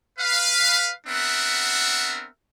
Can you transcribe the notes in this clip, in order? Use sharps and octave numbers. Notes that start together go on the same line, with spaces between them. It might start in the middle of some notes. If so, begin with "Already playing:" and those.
B4 F5
B3 C4 D4 A#4 E5 F#5